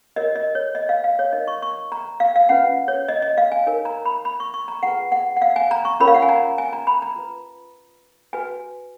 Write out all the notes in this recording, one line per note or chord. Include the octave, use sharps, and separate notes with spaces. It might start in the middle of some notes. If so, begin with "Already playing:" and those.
F#4 A#4 C#5 D#5
D#5
C#5
D#5
F5
F5
C#5
D#4 A#4 C#5 D#5
C#6
C#6
A#5
F5
F5
C#4 F4 B4 F#5
C#5
D#5
D#5
F5
G#5
D#4 A#4 C#5 G#5
A#5
B5
B5
C#6
C#6
A#5
F4 G#4 B4 F#5
F#5
F#5
F5
G#5
A#5
C#6
C#4 F4 A#4 C#5 B5
F5
F#5
G#5
A#5
G#5
A#5
B5
A#5
F4 B4
F#4 B4 G#5